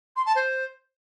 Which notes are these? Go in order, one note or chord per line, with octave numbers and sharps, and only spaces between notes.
C6
A5
C5